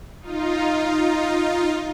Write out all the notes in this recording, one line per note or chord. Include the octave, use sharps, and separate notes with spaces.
D#4 F4